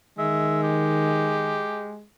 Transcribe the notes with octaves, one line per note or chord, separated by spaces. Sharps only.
D#3 G#3 E5
G4